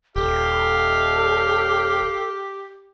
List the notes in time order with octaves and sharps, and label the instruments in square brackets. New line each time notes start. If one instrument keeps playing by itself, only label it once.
[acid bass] D#1 [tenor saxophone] G4 [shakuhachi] A4 [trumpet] F5